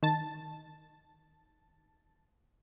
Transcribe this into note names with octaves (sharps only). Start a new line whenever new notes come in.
D#3 A5 A6